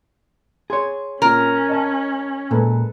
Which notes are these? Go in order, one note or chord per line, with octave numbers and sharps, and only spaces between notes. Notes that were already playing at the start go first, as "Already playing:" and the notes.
G#4 C#5 C6
A#2 C#4 A#4 A#5
D#5 A5
A#2 G#3 A4 B4